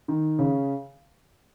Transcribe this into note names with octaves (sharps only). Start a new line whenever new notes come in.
D#3
C#3